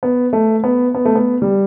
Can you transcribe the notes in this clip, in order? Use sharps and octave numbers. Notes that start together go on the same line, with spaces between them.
B3
A3
B3
B3
A3
B3
G3